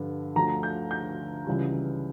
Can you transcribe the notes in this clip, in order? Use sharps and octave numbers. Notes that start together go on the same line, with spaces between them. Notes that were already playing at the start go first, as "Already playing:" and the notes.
Already playing: G2 D3 F3
D2 D3 F3 A3 A#5
G6
G6
C#2 C#3 E3 G3